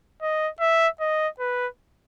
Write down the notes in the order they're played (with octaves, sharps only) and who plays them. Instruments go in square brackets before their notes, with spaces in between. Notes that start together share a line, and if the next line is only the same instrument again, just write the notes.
[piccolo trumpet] D#5
E5
D#5
B4